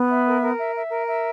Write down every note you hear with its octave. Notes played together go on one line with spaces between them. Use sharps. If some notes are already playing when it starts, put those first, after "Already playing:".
Already playing: B3
E5
A#4
A#4
E5
E5
A#4
E5